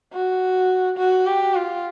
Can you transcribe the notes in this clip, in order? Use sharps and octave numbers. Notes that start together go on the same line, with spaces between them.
F#4
F#4
G4
F4